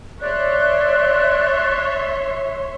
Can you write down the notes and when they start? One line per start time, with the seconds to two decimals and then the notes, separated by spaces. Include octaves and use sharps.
0.21 C#5 D5 E5 C6 F#6